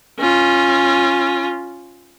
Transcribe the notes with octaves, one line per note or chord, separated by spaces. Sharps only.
C#4 F4